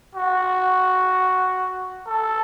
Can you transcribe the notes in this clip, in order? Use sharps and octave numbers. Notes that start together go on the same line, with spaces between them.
F#4
A4